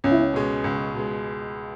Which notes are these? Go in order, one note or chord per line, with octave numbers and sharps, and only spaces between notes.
C#2 C#4
E4
C#4
B2 G#3
C#2
B2 G#3